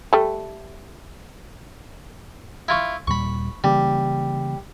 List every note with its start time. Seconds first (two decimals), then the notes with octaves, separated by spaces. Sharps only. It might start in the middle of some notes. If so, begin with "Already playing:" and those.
0.13 G3 A3
2.68 E4 F4 C#6
3.07 D#2 A#2 G3 B5 C#6
3.64 C#3 E3 G3 A#3